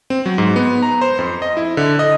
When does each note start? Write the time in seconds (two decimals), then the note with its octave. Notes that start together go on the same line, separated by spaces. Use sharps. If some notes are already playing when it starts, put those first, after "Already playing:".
0.10 C4
0.26 F#3
0.38 G#2
0.56 B3
0.82 A#5
1.01 C5
1.19 F2
1.42 D#5
1.57 E4
1.77 D3
1.99 D#5